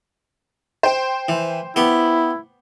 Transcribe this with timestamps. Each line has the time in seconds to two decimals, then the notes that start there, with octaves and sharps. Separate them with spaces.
0.83 C5 G5
1.29 E3
1.76 B3 E4 G4